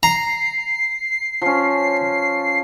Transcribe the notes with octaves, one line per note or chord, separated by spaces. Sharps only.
A#5 C7
F3 C#4